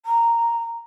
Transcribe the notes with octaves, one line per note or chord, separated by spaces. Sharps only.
A#5